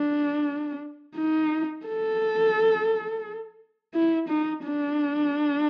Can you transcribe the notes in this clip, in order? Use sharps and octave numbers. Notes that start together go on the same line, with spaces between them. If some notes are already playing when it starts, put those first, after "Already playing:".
Already playing: D4
D#4
A4
E4
D#4
D4